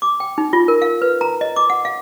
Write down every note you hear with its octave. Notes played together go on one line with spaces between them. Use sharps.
D6
G5
D#4
F4
A#4
F5
B4
A#5
D#5
D6
F#5
F5